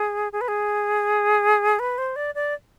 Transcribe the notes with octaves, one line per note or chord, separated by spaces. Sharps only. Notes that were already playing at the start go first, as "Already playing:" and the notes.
Already playing: G#4
G#4
B4
G#4
B4
C5
D5
D5